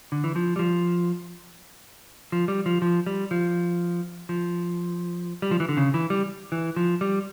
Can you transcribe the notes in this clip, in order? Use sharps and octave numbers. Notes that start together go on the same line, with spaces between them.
D3
E3
F3
G3
F3
F3
G3
F3
F3
G3
F3
F3
G3
F3
E3
D3
C#3
E3
G3
E3
F3
G3